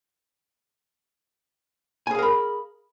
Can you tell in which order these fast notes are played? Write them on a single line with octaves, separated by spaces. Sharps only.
G#5 G#4 F5 A#4 B5